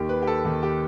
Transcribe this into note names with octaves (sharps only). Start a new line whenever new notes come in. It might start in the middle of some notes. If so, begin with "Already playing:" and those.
Already playing: D#2 D#3 G4
B4
G4
A4
D#2 D#3 G4
G4